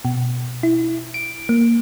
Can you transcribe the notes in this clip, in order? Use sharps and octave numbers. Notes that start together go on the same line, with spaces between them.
B2
E4
D7
A#3